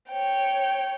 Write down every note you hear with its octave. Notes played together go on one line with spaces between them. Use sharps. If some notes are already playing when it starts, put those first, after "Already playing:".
C#5 G5